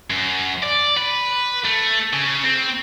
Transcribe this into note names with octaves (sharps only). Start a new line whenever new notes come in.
F#2
D5
B4
A3
C#3
C4